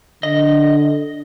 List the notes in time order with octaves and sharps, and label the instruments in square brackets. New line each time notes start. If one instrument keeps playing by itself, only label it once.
[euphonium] D3 [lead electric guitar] D#5